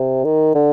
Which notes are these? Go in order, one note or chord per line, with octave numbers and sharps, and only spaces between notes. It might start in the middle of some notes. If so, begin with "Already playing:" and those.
Already playing: C3
D#3
D3